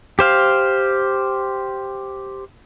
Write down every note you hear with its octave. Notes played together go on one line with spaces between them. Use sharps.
G4 C5 F5